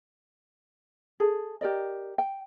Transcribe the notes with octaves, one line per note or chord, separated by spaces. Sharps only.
G#4 A4
G4 A#4 D5 D#5
G5